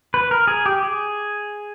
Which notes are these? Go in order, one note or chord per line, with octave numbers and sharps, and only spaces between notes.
B4
A#4
G#4
G4
G#4